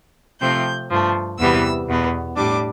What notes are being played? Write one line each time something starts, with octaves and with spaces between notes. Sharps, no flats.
C3 F3 A3 C4 G6
G2 F3 A3
E2 C3 E3 G3 B3 E6
E2 B2 B3
A2 G3 D4 D6